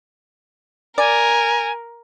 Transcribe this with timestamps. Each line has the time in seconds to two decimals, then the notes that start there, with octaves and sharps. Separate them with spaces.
0.98 A#4 D5 G#5